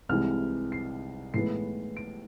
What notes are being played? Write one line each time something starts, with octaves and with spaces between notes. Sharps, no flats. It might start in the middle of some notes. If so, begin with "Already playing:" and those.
C2 C3 E3 G#3 F6
C7
A2 E3 G#3 B3 C7
D7